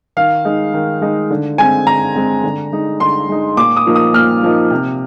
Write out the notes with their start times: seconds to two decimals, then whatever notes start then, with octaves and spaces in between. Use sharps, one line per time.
0.17 D#3 F5
0.45 G#3 D#4
0.74 D#3
1.01 G#3 D#4
1.30 D3
1.58 G#3 C4 G#5
1.87 D3 A#5
2.15 G#3 C4
2.44 D3
2.72 G#3 D#4
3.00 D3 C6
3.29 G#3 D#4
3.57 A#2 D6
3.76 D#6
3.86 F3 A#3 D#4
3.96 D#6
4.14 A#2 F6
4.43 F3 A#3 D#4
4.71 C3